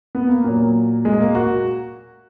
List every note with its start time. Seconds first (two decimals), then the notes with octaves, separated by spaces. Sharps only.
0.15 B3
0.29 A#3
0.44 A#2 F#3
1.05 G#3
1.20 A#3
1.35 F#4